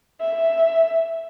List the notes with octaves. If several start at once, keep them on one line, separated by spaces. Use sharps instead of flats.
E5